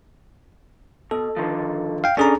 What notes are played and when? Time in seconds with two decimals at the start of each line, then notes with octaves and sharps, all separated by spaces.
1.11 B2 A4
1.36 D3 D#3 F3
2.04 F5 G5
2.17 C#4 D4 G#4 A4 A#5